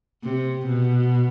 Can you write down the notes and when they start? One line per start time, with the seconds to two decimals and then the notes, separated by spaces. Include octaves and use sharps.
0.23 C3
0.66 B2